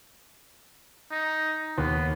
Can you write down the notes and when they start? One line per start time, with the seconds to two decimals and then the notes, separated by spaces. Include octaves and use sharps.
1.11 D#4
1.78 D#2 B3